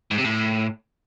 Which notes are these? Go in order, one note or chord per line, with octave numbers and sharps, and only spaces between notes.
G#2
C3
A2